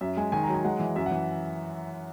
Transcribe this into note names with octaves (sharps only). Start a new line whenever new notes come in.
F#2 E5
G#3 G#5
D#3 G#5
A#5
F#3
G#5
G#3 F#5
E3
F#2 E5
F#5
E3